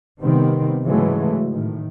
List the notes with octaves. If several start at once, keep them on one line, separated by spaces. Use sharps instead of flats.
C3 D#3 G3 B3 C4
G#2 C#3 E3 F#3 G#3 A3
A2 D#3